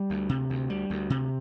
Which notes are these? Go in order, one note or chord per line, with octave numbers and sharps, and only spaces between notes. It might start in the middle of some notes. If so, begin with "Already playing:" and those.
Already playing: G3
D2
C3
D2
G3
D2
C3